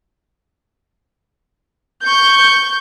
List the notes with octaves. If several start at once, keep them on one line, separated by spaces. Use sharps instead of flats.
C#6 G6